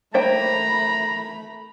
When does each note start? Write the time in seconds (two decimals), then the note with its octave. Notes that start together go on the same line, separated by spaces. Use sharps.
0.14 A3 A#3 C5 G5 A#5 B5